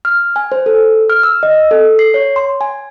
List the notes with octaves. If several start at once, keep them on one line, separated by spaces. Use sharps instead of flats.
F6
G#5
C5
A4
F6
E6
D#5
A4
C7
C#5
C6
G#5